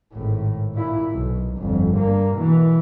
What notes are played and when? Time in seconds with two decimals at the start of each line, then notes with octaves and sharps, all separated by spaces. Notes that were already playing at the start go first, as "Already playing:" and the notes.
0.13 G#1 A2
0.74 A#2 E4
1.12 B1
1.58 G1 F2
1.92 G2 A#3
2.35 B2 E3